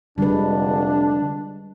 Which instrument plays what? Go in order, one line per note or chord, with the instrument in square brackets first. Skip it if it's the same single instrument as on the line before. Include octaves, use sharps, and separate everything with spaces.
[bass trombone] F1 [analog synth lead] D3 [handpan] G3 G#3 B4 [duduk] D4